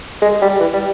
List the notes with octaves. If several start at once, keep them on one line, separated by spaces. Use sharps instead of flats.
G#3
G3
E3
G3